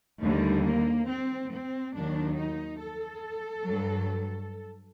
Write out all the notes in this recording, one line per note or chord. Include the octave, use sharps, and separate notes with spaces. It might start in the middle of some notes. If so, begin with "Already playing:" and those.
D#2 D3 G3 A3
A#3
C4
C4
D#2 D#3 F#3 D4
D#4
A4
G2 F#3